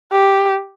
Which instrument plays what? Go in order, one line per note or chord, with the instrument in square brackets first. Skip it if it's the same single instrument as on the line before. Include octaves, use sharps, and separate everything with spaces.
[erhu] G4